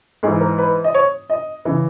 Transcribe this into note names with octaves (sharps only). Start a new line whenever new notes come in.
G#2 E3 G#4
A#4
B4
D#5
C#5
D#5
C#3 E3